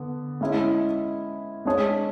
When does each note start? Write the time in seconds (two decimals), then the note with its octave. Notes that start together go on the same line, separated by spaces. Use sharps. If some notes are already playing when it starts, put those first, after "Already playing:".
Already playing: D3 B3
0.41 G#3 C#4 E4
1.65 G#3 D4 G#4 C#5